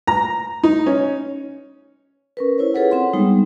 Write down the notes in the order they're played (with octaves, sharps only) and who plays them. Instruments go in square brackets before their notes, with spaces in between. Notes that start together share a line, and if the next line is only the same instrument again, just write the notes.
[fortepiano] A#5
D#4
C#4
[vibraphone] C#4 A#4 B4
E4 C5 C#5
F4 G#4 A4 B4 C#5 F#5
C4 F#5 C6
G3 G#3 B3 D#4 G#4